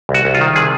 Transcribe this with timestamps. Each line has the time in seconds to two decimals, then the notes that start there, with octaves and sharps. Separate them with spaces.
0.09 C2
0.14 F#4
0.25 C2
0.35 F4
0.41 D#3
0.56 C3 G#4